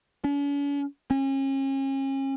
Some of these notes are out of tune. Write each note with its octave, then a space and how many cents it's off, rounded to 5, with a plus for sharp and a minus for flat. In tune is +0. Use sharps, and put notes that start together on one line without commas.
C#4 +45
C#4 -35